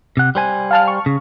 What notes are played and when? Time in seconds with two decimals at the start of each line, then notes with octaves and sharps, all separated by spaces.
0.17 C3 F#5
0.35 G3 C5 G#5
0.71 F5 A5 F6
0.88 C#6
1.06 C#3